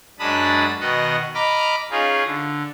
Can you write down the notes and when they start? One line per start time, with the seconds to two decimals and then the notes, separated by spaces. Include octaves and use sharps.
0.19 F#2 G#3 D4 A5 B5 D#6
0.80 B2 D#3 D#5 F#5
1.35 D#5 A#5 B5 D6 F6
1.91 C#4 D#4 F4 G#4
2.25 D3